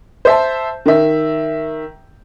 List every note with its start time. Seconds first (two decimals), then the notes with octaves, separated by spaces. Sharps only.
0.25 C5 E5 A5
0.86 D#3 E5